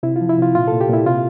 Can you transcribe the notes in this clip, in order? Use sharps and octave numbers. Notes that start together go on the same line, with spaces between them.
C3 E4
F4
F3
E4
C3 F4
A#2 F4
A#2 A4
G4
A#2 E4
C3 F4